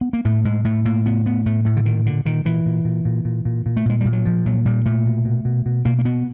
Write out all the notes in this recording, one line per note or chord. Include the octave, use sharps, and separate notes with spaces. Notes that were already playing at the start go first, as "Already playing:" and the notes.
B3
A#3
A2 A3
A2 G#3
A2 A3
A2 A#3
A2 B3
A2 B3
A2 A3
A2 A3
D3
A#2 D#3
A#2 D3
A#2 D#3
A#2 E3
A#2
A#2
A#2
A#2
A#2
A#2
A3
A#2 G#3
A#2 G3
F#3
A#2 F3
A#2 F#3
A#2 G3
A#2 A3
B2
B2
B2
B2
B2 A#3
A#3
B2 B3